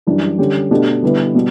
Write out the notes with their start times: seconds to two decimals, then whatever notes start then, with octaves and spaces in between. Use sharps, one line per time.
0.07 F#2 E3 G3 D4
0.39 D3 G3 C#4 G4
0.71 B2 A3 D4 G4
1.02 D3 G3 B3 E4 B4
1.35 B2 G3